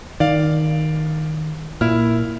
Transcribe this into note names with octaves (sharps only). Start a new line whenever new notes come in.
D#3 D5 F5
A#2 E4 F6